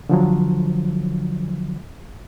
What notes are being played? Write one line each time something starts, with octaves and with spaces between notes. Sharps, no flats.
D3 F3 F#3